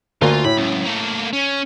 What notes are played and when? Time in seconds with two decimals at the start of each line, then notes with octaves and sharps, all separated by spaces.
0.22 D2 A#3 F4
0.44 A2 B5
0.57 C#2 F#2
0.85 A3 A#3
1.33 C#4